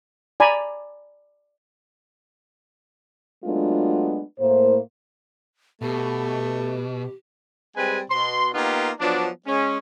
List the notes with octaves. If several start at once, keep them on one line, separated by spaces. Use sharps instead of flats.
D5 G#5 A#5 B5
F#3 G#3 A3 B3 D4 F4
A2 A#3 C5
B2 A3 G4
G3 G#3 C4 B4 G#5
B2 C6
A#3 B3 D#4 F4 G4
F3 F#3 B3 D4
G#3 C#4